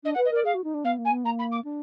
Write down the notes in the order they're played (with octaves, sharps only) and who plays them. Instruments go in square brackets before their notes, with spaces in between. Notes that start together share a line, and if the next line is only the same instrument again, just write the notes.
[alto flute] D4 [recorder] D#5
[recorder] F#5
[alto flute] B4
[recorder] D#5
[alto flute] A#4 [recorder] D5
[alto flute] G#4 [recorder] F5
[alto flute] F#4
D#4
D4
[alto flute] B3 [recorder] F5
[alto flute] A#3
[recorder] G#5
[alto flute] B3
[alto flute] A#3 [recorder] A#5
[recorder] B5
D6
[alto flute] D4